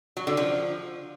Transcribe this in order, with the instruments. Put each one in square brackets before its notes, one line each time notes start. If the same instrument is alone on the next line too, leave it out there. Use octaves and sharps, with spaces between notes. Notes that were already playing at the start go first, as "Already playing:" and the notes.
[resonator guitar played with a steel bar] F#3
D3
F3